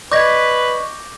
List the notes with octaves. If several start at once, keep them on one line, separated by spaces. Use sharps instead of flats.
B4 D5 D#5 C#6 D6 G6 G#6 A#6